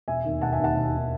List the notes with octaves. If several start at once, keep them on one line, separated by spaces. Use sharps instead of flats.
E1 E5 G#5
D#2 D#3
E1 F#5 A5
E5 G#5
D#2 D#3 F#5 A5
E1
D#3